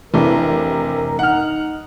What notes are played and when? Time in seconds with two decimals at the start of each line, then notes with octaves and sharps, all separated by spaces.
0.14 F1 C3 E3 A3 D4 A#4
1.19 D#4 F#5 F6